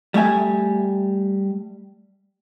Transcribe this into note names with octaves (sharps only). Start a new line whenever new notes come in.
G3 A3 E5 G#5